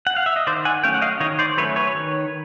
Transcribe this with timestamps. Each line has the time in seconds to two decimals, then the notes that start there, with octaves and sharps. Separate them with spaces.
0.07 F#5
0.16 F5
0.26 E5
0.36 D#5
0.47 D#3 C5 D5
0.65 F#5 G#5
0.84 F#3 A3 C#4 F5 G5
0.94 F#5
1.02 D#5 F5
1.20 D#3 C#5 D#5
1.39 C5 D5
1.57 F#3 A3 C#4 B4 C#5
1.76 B4 C#5
1.95 D#3